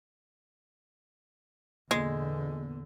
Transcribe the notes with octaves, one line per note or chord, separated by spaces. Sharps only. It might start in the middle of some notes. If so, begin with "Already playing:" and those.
E2 A#2 D3 G#3 B3